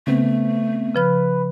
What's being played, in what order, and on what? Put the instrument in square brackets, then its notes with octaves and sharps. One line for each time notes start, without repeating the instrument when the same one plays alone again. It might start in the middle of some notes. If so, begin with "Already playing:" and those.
[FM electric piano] C#3 B3 C4 [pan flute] A3
[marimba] C#3 F3 F6 [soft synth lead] B4